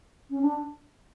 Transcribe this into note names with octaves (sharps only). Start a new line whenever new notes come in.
C#4
D4